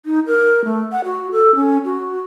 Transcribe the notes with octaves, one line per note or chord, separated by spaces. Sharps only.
D#4
A#4
A3
F#5
F#4
A4
C#4
F#4